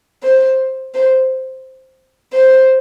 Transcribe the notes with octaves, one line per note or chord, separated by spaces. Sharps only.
C5
C5
C5